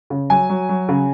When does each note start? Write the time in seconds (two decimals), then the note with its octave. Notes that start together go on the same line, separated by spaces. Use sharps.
0.10 C#3
0.30 F#3 G#5
0.49 F#3
0.69 F#3
0.89 C#3